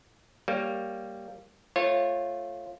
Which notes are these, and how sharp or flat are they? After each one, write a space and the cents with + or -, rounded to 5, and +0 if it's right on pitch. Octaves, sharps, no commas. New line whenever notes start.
G3 +0 A#3 +0 C#5 +0
A3 +0 F4 +0 C#5 -25